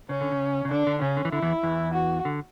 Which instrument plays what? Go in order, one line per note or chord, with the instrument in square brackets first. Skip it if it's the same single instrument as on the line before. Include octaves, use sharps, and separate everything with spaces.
[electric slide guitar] C#3 [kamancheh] C#4
[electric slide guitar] D3
C#3
C#3
[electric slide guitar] D3 [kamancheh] D4
[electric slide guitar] D3
[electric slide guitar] C#3 [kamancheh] C#4
[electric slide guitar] D3
E3
[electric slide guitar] D3 [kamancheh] E4
[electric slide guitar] E2 E3
E2 E3
[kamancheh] F#4
[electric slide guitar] D3